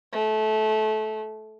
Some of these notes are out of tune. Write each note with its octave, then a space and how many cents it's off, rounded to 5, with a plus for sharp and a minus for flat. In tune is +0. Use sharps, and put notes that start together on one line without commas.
A3 -25